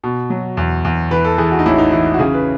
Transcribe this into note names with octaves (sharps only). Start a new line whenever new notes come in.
B2
F#3
E2
E2
E3 B4
A4
E3 G#4
F#4
D#4
A1 E4
D#4
E3 E4
F#4
C#3 G#4
B4